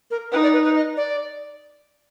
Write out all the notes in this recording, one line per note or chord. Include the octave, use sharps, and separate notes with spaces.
A#4
D#4 B4
D5
B4
B4
D#5
D5